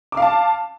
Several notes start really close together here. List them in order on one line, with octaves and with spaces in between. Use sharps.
D6 F5 A5